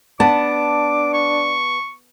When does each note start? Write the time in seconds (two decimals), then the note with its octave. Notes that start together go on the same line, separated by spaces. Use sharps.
0.20 B3 D4 A5 D6
1.14 C#6